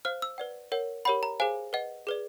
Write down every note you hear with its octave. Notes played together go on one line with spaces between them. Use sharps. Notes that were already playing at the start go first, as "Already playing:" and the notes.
C5 F5 F6
E6
B4 D5 F#5
A#4 C#5 F#5
G4 A#4 C#5 F#5 B5
A#5
G#4 C5 F5 G#5
B4 D#5 F#5
G#4 B4 D5